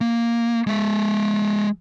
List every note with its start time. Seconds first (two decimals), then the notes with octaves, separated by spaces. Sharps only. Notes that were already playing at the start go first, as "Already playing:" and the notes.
0.01 A#3
0.67 G#3 E5